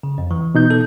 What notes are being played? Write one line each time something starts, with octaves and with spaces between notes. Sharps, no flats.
C#3
F2
E3
B2 D#4 G6
A4